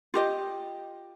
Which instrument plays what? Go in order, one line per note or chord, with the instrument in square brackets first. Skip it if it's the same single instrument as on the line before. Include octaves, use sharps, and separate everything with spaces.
[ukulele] F4 G4 D#5